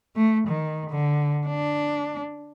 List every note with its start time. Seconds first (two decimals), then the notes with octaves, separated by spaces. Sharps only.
0.16 A3
0.48 D#3
0.90 D3
1.47 D4